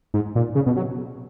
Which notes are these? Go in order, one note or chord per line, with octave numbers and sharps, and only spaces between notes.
G#2
A#2
C#3
B2
F#3